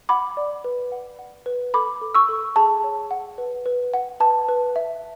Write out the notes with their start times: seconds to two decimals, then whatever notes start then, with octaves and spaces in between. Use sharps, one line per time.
0.09 F#5 B5 D6
0.37 D5
0.64 B4
0.92 F#5
1.19 F#5
1.46 B4
1.74 A4 B5 D6
2.01 A4
2.15 C#6 E6
2.29 A4
2.56 G#4 A5
2.84 C#5
3.11 F#5
3.38 B4
3.66 B4
3.94 F#5
4.20 B4 A5
4.49 B4
4.76 E5